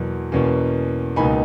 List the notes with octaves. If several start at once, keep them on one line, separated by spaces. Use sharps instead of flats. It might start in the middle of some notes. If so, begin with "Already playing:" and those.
Already playing: E2 B2 F#3 A#3
E2 B2 A#3 C#4
C#2 B2 A#3 D#4 G#5 B5